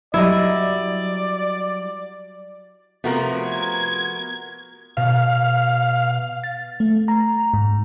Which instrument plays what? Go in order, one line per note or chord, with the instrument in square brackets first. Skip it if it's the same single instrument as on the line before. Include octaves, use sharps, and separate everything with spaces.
[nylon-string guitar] F#3 G3 D#5 [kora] E4 [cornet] D5
[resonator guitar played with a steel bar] C3 F3 A3 [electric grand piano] B3 F#4 A#4
[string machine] G#6
[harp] B2 [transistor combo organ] F5
[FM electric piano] A6
A3
A#5
G#2